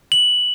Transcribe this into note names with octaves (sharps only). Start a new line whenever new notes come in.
F#7